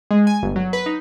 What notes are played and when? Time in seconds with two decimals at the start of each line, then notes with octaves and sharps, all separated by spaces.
0.11 G#3
0.27 G#5
0.43 G1
0.56 F#3
0.73 B4
0.86 D#4